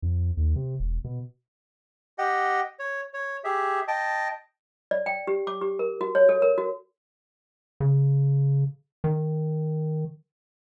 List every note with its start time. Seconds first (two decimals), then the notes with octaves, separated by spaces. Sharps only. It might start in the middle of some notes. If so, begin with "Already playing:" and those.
0.02 F2
0.37 D#2
0.56 C3
0.80 E1
1.04 B2
2.18 G4 D#5 F#5 G5
2.79 C#5
3.14 C#5
3.44 G4 G#4 E5
3.88 D#5 G5 A5
4.91 D5
5.06 G5
5.27 G4
5.47 D6
5.61 G4
5.79 A#4
6.01 F#4
6.15 C#5
6.29 A4
6.42 A#4
6.58 F#4
7.80 C#3
9.04 D#3